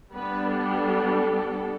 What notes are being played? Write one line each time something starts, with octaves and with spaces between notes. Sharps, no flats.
G3 B3 D4 B4
A4